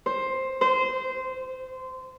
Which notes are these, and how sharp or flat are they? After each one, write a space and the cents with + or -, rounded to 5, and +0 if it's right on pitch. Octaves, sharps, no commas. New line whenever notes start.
C5 +10
C5 -20